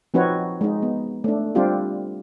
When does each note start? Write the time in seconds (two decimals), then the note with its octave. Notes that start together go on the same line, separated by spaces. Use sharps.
0.14 F3 C4 D#4 F#4 B4 C#5
0.61 G#3 D#4
0.83 B3
1.24 A3 D4
1.55 G3 C4 D4 F4 G4